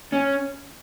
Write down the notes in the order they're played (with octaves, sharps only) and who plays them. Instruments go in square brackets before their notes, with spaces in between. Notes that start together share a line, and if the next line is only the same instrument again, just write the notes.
[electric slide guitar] C#4